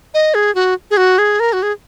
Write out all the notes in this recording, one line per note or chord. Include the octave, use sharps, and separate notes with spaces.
D#5
G#4
F#4
G#4
F#4
G#4
A#4
F#4
G#4